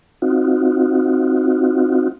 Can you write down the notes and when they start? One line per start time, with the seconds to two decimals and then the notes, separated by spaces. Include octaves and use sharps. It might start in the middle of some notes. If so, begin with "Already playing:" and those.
0.22 C4 D#4 F4 F#4